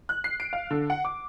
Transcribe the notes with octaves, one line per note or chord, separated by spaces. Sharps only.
F#6
C7
D7
F5
D3
F#5
D6